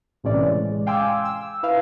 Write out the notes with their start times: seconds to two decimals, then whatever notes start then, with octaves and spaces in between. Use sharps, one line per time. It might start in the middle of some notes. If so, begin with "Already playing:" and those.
0.23 B1 A2 C3 E3 C#4 D5
0.48 G#3
0.86 F5 G5 G#5 C6 D6 E6
1.25 E6
1.63 E4 B4 F5